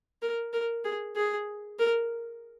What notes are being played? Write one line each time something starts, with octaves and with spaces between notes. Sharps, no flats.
A#4
A#4
G#4
G#4
A#4